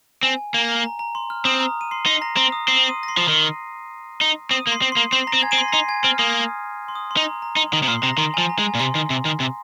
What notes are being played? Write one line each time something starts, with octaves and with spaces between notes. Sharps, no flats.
C4 G#5
A#3
A#5
A#5
C6
F6
C4 D#6
A#5
D#7
C6 C7
D#4 C6 C7
A#5 A#6
C4 A#5 A#6
D#6
C4 C6 C7
D#6 D#7
A#6
C6 C7
F3
D#3
D#4
C4 D#6 D#7
A#3
C6 C7
C4
A#3 C6 C7
C4 C6 C7
A#5 A#6
C4
G#5 G#6
C4 D#7
C6 C7
A#6
D#4 C6 C7
G#5 G#6
C4 F6
A#3 D#6
C6
D#6
C6
D#4
A#5
A#5
D#4 C6
D#3 D#6
C3
A#2 C6 C7
C3 A#5 A#6
D#3 C6
F3 G#5
A#5
G#3
G#5
A#2
C3 C6
D#3
C3
D#3
C3